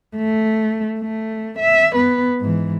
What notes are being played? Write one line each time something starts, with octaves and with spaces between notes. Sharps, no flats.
A3
A3
E5
B3 B4
G#2 E3